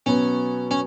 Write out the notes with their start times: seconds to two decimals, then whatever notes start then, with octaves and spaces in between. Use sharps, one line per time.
0.06 B2 F#3 B3 C#4
0.71 C#4